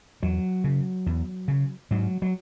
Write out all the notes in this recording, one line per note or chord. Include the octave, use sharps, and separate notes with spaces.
E2 F#3
C#3
E2
C#3
G#2 F#3
F#3